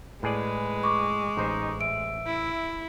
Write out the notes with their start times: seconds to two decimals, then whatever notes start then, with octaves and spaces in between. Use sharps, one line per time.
0.23 A2 G#3 G#4 B4 D5
0.83 C#6 D6
1.37 A1 D#4 C5
1.81 E5 D7
2.27 E4